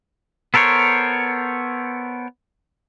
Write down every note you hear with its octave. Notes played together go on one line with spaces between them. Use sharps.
B3 A4 A#4 C5 C#5